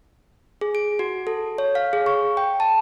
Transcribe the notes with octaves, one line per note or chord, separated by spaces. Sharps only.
G#4
D7
F#4
A4
C#5
F5
G#4
C#6
G5
A5